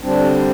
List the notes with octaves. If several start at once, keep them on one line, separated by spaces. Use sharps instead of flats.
D3 G3 C4 D4